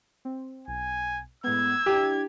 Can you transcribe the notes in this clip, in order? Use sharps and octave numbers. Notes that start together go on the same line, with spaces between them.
C4
B1 G#5
A2 G#3 B3 E6 G#6
D4 E4 G4